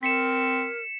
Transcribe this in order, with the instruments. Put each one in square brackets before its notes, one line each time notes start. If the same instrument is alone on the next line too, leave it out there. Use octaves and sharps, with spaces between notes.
[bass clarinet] C4 [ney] A#4 [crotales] B6 C#7 E7